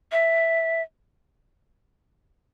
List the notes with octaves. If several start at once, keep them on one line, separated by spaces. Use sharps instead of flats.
E5